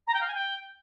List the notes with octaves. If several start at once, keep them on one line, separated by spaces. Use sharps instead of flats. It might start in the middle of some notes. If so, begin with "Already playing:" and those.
A#5
G5
F5
G#5
G5